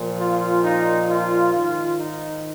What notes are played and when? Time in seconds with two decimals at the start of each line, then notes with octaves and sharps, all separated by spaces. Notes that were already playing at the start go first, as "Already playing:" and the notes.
Already playing: A#2 F3
0.20 F4
0.65 D#4
1.09 F4
1.53 G#2 D#3 F4
1.98 D#4